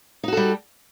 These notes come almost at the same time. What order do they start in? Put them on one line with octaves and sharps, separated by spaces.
D#4 F#4 A4 G3